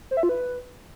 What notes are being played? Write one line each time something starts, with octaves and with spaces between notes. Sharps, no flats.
C5
E5
F4
B4